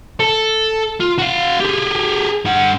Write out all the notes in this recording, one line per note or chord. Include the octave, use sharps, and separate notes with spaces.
A4
F4
F#4 F5
G4 G#4
G2 F#5